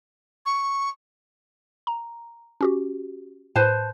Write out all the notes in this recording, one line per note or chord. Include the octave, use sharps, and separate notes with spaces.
C#6
A#5
C#4 F#4 G4
A2 B4 C5 A5